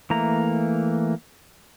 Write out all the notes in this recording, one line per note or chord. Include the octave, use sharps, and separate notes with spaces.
E3 A3 A#3 A#5